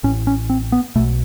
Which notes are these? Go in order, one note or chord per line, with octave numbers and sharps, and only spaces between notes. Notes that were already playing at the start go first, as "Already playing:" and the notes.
A1 A2 C#4
C#4
C4
B3
B1 B2 A3